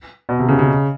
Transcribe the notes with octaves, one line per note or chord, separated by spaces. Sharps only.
B2
C3
C#3
C#3